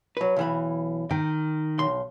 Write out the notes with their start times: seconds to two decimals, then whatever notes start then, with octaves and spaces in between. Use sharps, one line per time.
0.17 F#3 B4
0.36 B1 E3 B5
1.11 D#3 G5
1.79 B1 C6